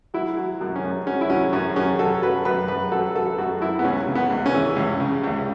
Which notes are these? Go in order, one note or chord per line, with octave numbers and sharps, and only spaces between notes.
F#3 E4
F#3
F#2
C#4
F#2
F#3 C#4
E4
F#3 C#4
F#2 C#4
F#2 C#4
F#3 A4
F#3 B4
F#2 B4
F#2 B4
F#3 A4
F#3 A4
A4
F#2 F#4
F#2 E4
B3
C#2 C#4
C#3
B3
C#2
C#4
E3
C#2
C#3
C#2